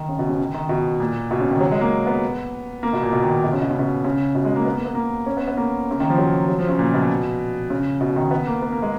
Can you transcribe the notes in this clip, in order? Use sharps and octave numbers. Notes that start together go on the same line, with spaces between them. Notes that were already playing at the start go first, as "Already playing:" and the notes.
Already playing: D#3
C#3
B2
C#3
D#3
D#3
B2
A#2
B2
C#3
D#3
F#3
G#3
A#3
B3
A#3
B2
A#2
B2
D#3
B2
C#3
B2
C#3
B2
C#3
B2
G#3
A#3
B3
A#3
B3
A#3
C#4
B3
B3
A#3
C#3
D#3
F3
F#3
F#3
F3
C#3
A#2
B2
C#3
B2
D#3
B3
A#3
B3
A#3
G#3